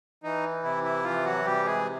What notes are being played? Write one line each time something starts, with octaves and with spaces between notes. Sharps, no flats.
E3 D#4
C3 E4
E4
E3 F3 F4
F#3 F#4
C3 G3 G4
G#3 G#4